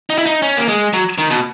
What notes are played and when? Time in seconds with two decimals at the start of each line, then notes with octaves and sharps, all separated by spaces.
0.10 D#4
0.18 E4
0.26 D#4
0.42 C#4
0.57 A#3
0.68 G#3
0.94 F#3
1.18 D#3
1.30 B2